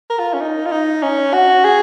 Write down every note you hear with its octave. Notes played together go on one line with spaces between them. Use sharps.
A#4
F4
C#4
D#4
F4
D#4
C#4
F#4
G#4